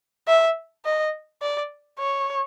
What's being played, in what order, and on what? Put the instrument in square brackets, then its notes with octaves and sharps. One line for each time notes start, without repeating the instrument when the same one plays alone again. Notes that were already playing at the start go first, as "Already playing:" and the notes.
[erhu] E5
D#5
D5
C#5